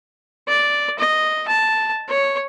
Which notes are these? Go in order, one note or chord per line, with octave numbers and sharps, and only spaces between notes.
D5
D#5
A5
C#5